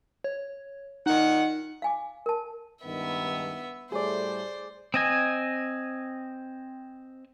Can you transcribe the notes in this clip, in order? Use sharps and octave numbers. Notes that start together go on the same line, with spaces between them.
C#5
A#2 D#3 D#4 F#5
F5 G#5 D6
A#4 A5
C#2 G2 D#3 B3 E5
A2 G3 A3 G#4 C5 D5
C4 D#5 G#5